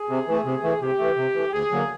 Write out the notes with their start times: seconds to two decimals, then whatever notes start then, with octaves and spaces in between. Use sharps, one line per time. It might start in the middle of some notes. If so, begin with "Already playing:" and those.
Already playing: G#4
0.09 C3
0.27 E3 A3
0.45 C3
0.63 E3 A3
0.81 C3 G4
0.99 E3 A3
1.17 C3
1.35 E3 A3
1.52 D2 G#4
1.71 D3 F#3 A#3